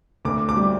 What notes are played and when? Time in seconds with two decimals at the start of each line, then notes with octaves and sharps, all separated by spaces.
0.25 D2 D6
0.49 D6
0.57 G3